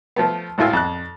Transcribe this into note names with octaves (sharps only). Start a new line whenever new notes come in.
F3 A3 B3
G#1 A2 E4 F4 G#5 E6
F2 F#6